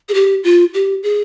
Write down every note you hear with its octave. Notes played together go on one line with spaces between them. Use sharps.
G#4
G4
F4
G4
G#4